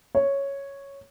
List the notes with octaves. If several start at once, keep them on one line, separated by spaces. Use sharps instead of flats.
C#5